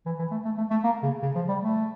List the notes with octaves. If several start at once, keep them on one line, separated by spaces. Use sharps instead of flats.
E3
E3
A3
A3
A3
A3
A#3
C#3
C#3
F3
G3
A3